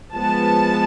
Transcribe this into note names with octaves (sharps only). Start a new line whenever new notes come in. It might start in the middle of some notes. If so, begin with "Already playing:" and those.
F3 G#3 B3 A5